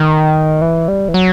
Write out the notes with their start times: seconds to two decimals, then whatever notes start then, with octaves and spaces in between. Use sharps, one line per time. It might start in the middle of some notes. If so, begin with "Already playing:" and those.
Already playing: D#3
0.62 E3
0.88 G3
1.08 E3
1.14 F#3